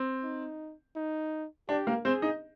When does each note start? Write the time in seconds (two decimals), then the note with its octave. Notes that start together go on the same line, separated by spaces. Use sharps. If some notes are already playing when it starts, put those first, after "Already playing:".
Already playing: C4
0.23 D#4
0.96 D#4
1.69 D4 G4
1.87 A#3 A#4
2.05 C4 G#4 C5
2.22 D#4 D#5